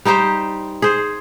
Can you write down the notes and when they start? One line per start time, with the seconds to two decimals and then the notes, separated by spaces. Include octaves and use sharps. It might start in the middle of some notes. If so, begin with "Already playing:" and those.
0.05 G3 D#4 G4 C5
0.82 G#4 C5